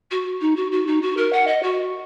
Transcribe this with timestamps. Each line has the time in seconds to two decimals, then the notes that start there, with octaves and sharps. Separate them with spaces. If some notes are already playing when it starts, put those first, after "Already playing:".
0.11 F#4
0.41 D#4
0.56 F#4
0.71 F#4
0.87 D#4
1.01 F#4
1.17 A#4
1.32 F#5
1.47 D#5
1.62 F#4